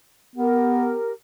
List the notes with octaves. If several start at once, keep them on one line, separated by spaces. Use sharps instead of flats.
B3 G4 A#4